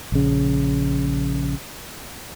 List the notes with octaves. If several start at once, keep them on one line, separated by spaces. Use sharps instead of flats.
A#1 C#3